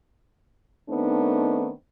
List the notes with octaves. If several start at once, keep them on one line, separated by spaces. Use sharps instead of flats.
D#3 A3 B3 C4 D4 D#4